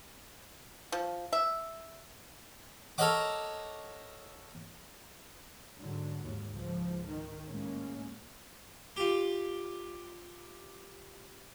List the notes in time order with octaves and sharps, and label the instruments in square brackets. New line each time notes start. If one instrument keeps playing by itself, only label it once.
[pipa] F3
E5
[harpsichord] A4 A#4 C#5 D#5 F#5 D6
[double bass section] G#2 D3 F#3
D#2 G#2
C#2 G#2 F3
D#3
A2 G#3 A#3 C#4
[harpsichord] F4 G4